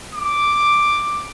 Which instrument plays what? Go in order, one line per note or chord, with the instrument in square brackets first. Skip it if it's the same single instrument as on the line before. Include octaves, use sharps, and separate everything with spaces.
[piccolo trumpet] D6